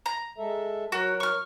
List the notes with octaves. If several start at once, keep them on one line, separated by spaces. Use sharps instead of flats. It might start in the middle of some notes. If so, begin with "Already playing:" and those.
A#5
G#3 A4 E5
F#3 F#4 A#4
C#6 F6